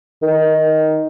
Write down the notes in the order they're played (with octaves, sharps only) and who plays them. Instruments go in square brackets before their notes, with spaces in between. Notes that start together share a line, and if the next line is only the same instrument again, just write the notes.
[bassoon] D#3